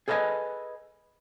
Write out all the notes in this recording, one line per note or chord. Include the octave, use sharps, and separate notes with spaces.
G#4 A4 B4 C#5 D#5 G#5